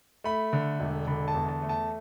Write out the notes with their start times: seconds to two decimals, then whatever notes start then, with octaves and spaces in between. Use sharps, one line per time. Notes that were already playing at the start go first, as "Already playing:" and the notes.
0.24 A3 B5
0.53 D3
0.80 E1
1.07 D3 B5
1.28 A5
1.34 E2
1.48 A5
1.62 A3
1.69 A5